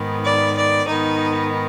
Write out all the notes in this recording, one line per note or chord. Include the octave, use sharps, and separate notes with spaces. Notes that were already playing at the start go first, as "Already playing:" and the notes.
Already playing: G#2 D#3 B3
D5
D5
G#2 D#3 B3 D#4